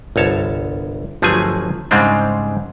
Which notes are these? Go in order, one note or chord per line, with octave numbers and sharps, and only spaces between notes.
G1 C2 C#5 A5
G1 F3 F#3 A3 G#4 G#5
G#2 C#3 G3 G#3 C4 D4